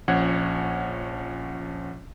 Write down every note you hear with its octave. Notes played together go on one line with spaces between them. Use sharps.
A#1 F3 C#4 F#5 G#6